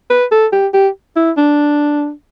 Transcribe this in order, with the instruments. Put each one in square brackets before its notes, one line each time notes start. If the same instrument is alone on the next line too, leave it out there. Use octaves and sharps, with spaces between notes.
[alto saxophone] B4
A4
G4
G4
E4
D4